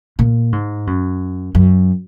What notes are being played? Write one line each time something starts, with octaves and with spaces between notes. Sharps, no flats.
A#2
G#2
F#2
F#2